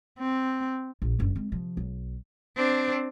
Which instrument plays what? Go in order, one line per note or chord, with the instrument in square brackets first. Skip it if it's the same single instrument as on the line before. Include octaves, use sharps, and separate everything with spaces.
[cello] C4
[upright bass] A#1
F#1 G2
G#3 C4
C3 F3
B1
[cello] C4 D4